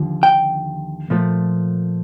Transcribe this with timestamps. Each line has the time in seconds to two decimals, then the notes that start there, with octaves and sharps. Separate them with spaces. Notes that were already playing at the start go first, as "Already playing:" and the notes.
Already playing: D#2 D3 F3
0.23 G5
1.10 A#2 F3 A3